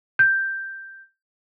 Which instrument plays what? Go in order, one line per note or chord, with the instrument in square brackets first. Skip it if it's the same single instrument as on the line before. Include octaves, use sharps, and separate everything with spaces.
[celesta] G6